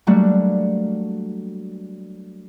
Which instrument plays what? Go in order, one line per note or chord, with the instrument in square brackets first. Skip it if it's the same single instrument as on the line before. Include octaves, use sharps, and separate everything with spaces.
[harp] F#3 G3 A3 A#3 D4 F#4